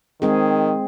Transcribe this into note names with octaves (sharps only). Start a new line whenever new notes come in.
D#3 G#3 C4 G#4